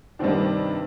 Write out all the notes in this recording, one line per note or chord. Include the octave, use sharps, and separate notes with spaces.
G2 C3 D#3 C4 D4